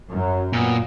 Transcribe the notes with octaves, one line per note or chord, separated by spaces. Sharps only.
F#2 F#3
A#2 B3